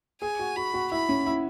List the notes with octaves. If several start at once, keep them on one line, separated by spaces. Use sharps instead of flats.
G#4 G#5
F#4
F#4 B5
F#4
E4 B5
C#4
E4